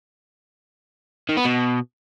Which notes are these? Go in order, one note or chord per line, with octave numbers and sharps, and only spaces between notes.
D#3
B3
B2